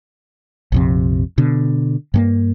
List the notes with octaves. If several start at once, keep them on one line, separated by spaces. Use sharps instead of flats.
A#1 F2 C3
B2 D3
G2 G#3 A#3